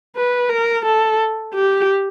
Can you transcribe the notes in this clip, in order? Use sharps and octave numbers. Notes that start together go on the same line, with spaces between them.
B4
A#4
A4
G4